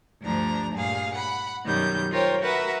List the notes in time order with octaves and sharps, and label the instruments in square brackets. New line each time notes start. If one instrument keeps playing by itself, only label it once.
[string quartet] D2 G2 F3 D4 A#5
G2 A#2 G#4 F5
F#5 B5
F#2 B2 D#3 G3 C#4 G6
F4 A#4 C5 C#5 G5
F#4 A#4 B4 E5 F#5